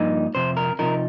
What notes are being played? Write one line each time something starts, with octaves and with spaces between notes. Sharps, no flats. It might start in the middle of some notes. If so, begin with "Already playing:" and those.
Already playing: G2 F3 A#3 D#4
F2 C3 C5
A#4
C3 F3 D#4 A#4